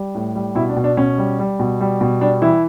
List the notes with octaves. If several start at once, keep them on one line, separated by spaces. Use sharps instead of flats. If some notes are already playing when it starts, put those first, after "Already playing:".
Already playing: G3
A2
G3
B2 E4
D4
B2
D4
B2 C#4
G3
G3
B2
G3
B2
G3 D4
E3 E4